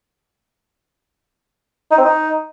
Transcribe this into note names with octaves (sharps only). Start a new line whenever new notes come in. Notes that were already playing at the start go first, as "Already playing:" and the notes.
D#4
C4
D#4